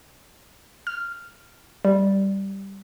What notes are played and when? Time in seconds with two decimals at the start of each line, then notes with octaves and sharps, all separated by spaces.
0.87 F6
1.85 G3